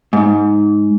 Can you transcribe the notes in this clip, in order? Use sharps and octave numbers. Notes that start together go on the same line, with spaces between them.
G#2